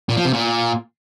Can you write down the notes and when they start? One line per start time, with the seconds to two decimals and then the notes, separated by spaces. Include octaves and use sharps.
0.09 A#2
0.17 F3
0.25 C3
0.33 A#2